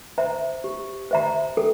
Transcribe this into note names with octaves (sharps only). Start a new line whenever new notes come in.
C5 E5 A#5
G4
C5 E5 A#5
A4